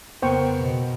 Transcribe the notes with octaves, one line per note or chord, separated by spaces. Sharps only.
F2 C#3 B3 A#4 C5 G5 C#6
B2